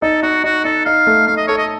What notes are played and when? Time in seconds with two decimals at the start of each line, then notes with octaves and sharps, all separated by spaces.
0.02 D#4 A4
0.23 D#4 F#4
0.44 D#4 F#4
0.65 D#4 A4
0.85 D#4 F5
1.07 A3
1.27 A3 F5
1.37 D#5
1.47 A4 C#5
1.58 D#5